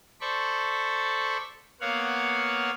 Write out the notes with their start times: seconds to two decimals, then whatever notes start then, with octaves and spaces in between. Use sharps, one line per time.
0.21 A4 C5 D5 B5 C#6
1.81 A#3 B3 C#5 F5 F#5